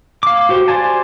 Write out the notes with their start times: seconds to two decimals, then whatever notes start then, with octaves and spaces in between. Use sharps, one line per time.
0.23 F5 D6
0.49 F#4 G4 C5
0.68 C5 D5 G#5 A5